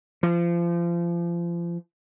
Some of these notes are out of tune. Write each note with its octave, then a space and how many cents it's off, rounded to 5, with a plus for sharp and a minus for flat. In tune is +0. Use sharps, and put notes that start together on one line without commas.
F3 -30